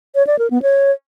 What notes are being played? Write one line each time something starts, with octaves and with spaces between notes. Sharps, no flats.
C#5
D5
A#4
B3
C#5